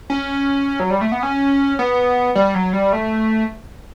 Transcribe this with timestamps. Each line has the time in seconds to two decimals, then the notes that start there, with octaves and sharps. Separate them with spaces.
0.10 C#4
0.80 F#3
0.90 G3
1.01 A3
1.12 B3
1.23 C#4
1.79 B3
2.35 G3
2.55 F#3
2.73 G3
2.93 A3